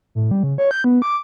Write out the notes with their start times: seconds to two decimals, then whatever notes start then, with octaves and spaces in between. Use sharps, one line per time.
0.15 A2
0.31 G3
0.43 C#3
0.58 C#5
0.71 G6
0.84 B3
1.02 D6